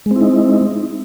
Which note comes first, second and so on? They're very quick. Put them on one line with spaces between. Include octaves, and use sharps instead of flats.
G#3 C4 E4 D#4